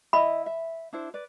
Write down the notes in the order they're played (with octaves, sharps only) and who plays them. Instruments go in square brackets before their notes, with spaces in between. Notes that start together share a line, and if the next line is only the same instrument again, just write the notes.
[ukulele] E4 D#5 E5 [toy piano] B5
[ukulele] E5
D4 E4 C5
B4 D5